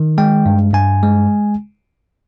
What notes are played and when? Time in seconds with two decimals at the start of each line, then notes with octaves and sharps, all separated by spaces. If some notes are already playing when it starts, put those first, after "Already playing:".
Already playing: D#3
0.18 G#3 G5
0.46 G2
0.74 G2 G#5
1.03 G#3